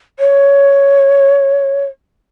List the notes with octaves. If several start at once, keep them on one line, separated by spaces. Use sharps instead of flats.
C#5